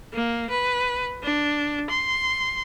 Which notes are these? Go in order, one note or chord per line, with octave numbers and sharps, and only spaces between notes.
A#3
B4
D4
C6